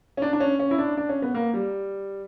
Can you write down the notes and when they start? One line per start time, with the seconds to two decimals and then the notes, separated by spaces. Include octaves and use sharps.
0.17 C#4
0.22 D4
0.33 D4
0.40 C#4
0.59 C#4
0.71 E4
0.78 D4
0.97 D4
1.09 C#4
1.22 B3
1.34 A#3
1.54 G3